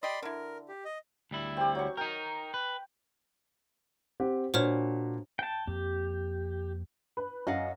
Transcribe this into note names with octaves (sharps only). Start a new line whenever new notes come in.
G4 D5 D#5 B5 C6
D3 E4 A#4
G4
D#5
D2 G3 E4
C4 G4
F#3 C#6
D#4 A#4 G5
B4
C4 G4 F#5
A#2 D4 F#4 C5 C#5 F6
G5 A5
F2 A#3 C4 G4
B4
F#2 D#5 F5 F#5